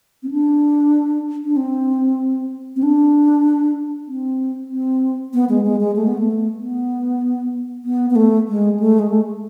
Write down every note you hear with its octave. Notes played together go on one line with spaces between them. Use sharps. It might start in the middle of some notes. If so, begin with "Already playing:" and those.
C4
D4
D4
C4
C4
D4
C4
C4
B3
G#3
G#3
G#3
A3
B3
A3
B3
B3
B3
A3
G#3
A3
G#3
A3